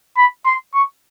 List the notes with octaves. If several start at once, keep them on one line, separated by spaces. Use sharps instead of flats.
B5
C6
C#6